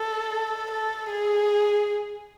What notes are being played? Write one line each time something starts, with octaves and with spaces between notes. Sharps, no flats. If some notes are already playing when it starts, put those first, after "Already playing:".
Already playing: A4
A4
G#4